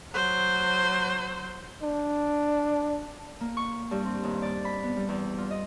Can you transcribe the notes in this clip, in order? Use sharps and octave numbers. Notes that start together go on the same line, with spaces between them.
F#3 C5
D4
A#3
C#6
G2
C4
D#2
D5
B5
B3
G3
E2
F4
D#5